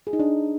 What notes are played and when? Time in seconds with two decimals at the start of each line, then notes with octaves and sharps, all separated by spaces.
0.07 G#4
0.13 D#4
0.19 D4